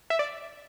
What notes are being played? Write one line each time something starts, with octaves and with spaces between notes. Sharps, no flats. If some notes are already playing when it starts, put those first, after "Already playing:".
E5
D5